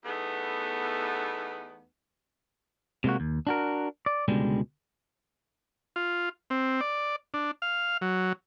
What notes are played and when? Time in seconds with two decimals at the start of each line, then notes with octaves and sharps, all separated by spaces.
0.05 E2 A3 B3 D#4
3.04 C3 G#3 A#3 F#4
3.20 D#2
3.47 D4 F#4 A#4
4.06 D5
4.28 C#2 B2 D3 G3 G#3
5.96 F4
6.50 C4
6.81 D5
7.34 D4
7.62 F5
8.02 F#3